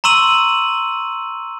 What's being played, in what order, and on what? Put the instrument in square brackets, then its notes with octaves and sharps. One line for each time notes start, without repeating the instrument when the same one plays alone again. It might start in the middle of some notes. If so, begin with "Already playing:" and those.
[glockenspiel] A#5 C6 C#6 E6 D#7 F#7